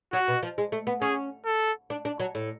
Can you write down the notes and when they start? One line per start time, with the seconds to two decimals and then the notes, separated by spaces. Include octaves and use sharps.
0.12 F#3 F#4
0.28 B2
0.43 F3
0.58 G#3
0.72 A3
0.87 B3
1.01 C#4 G#4
1.45 A4
1.90 D4
2.05 D4
2.20 F#3
2.35 A2